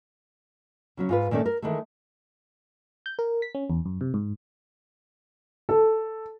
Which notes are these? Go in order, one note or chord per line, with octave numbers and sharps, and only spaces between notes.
C#3 F#3 C#4
G#2 F4 B4
A#2 D#3 A3 C#4 D5
A#4
D#3 E3 G#3 A3
G6
A#4
B6
C#4
E2
F#2
C3
G#2
A4